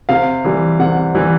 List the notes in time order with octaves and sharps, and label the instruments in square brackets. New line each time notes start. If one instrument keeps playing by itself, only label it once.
[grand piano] C3 F5
E3 G3
C3 F#5
E3 G3